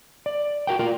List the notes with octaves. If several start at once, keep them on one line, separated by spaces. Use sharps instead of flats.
D5
F#4 A#4 G5
F4 A#4 D5